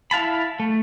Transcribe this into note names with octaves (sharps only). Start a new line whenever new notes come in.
E4 F5 A5 B5
A3